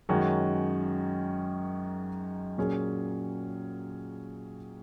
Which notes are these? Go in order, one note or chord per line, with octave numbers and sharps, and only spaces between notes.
F#2 D#3 G#3 C#4 F#4
A#2 F#3 C#4 G#4